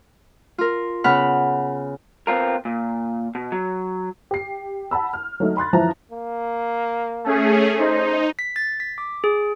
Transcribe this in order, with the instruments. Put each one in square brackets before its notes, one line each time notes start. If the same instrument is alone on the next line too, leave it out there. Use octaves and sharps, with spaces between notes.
[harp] F4 A#4
C#3 B3 F#5 B5 F6
[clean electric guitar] B3 C4 F4 A#4
A#2
B2
F#3
[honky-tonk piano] G4 C7
F#5 A5 B5 E6
F6
F#3 A3 D#4
B5 C6 F#6 A6
F#2 E3 F3 E4 A5 A#5
[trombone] A#3
[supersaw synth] A3 C#4 G#4
[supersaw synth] D#4 [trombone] C5
[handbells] B6
A6
B6
D6
G#4